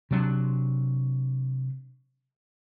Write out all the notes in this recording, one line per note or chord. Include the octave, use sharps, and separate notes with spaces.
C3 F#3 C#4 D4